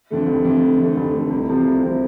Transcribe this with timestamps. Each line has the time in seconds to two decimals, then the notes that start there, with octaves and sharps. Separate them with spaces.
0.10 F2 D3 A3
0.27 F1
0.45 F2 D3 A3
0.61 F1
0.79 F2 D3 A3
0.96 F1
1.13 F2 D3 A3
1.30 C2
1.48 C3 F3 A3 C4
1.64 C2
1.82 C3 F3 A3 C4